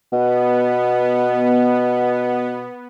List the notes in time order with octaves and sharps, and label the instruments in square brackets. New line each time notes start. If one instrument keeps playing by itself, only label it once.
[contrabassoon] B2 [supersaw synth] B3